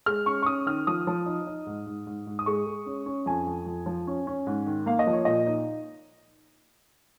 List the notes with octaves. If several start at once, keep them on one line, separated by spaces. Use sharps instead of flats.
G#3 F6
C#4 C#6
C#6
C#4 D#6
D#3 F6
F3 D#6
F3
D#4
D#4
G#2
G#2
G#2
G#2
D#6
G#3 C#6
G#3
C#4
C#4
F2 G#5
F2
F2
F3
C#4
C#4
G#2
D#3
A#3 F5
D#5
F3
C#5
A#2 D#5
D#4